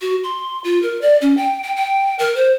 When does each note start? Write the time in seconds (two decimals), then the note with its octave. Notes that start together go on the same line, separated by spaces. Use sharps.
0.01 F#4
0.23 C6
0.64 F4
0.82 A#4
1.01 D5
1.21 C#4
1.37 G5
1.63 G5
1.76 G5
2.19 A#4
2.36 C5